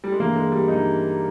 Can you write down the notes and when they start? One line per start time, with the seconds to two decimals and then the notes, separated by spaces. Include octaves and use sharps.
0.04 G3
0.12 G#3
0.20 G2 E3 A#3
0.36 G#3
0.52 G3
0.68 G2 E3 D#4